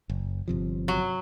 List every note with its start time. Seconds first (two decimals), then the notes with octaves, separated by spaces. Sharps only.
0.10 F#1
0.48 G1 C3 F3
0.88 F#3